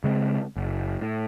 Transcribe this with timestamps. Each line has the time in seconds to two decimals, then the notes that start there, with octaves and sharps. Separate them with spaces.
0.04 C#3 G#3 A3 C4
0.56 F#1
1.01 A2